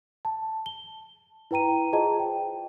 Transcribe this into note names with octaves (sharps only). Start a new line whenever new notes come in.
A5
G7
E4 B4 G5 A#5 D#7
F4 G#4 C5 D#5 A5 A#5
G5